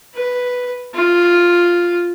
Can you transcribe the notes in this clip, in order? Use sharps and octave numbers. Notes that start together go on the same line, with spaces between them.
B4
F4